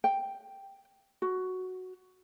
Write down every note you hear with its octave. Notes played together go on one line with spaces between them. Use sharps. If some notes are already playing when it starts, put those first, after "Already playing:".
G5
F#4